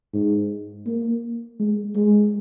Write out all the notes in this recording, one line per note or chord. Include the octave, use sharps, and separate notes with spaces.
G#2
A#3
G#3
G#3